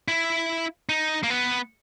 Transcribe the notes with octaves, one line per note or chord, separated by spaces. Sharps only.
E4
D#4
A#3
B3